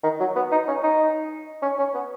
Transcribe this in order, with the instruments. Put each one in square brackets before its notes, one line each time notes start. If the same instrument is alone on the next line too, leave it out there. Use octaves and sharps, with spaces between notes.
[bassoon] D#3
F#3
B3
D#4
C#4
D#4
C#4
C#4
B3